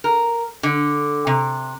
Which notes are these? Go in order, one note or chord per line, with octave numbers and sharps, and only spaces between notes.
A#4
D3
C3